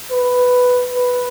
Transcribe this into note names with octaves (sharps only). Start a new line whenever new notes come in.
B4
B4